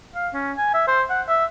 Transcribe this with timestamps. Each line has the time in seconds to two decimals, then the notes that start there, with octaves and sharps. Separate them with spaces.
0.15 F5
0.33 C#4
0.57 G#5
0.74 E5
0.88 C5
1.10 F#5
1.28 E5